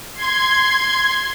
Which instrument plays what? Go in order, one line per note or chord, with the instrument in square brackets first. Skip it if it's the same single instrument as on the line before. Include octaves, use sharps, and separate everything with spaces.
[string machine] C6 G#6